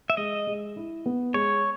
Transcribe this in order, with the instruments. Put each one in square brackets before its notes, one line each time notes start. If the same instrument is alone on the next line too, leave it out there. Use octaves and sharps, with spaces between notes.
[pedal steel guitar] E5
[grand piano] G#3 [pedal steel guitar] D#5
[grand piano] G#3
E4
B3
[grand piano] G#3 [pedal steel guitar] C#5